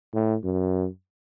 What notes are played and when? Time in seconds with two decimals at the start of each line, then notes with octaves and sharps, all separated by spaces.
0.14 A2
0.44 F#2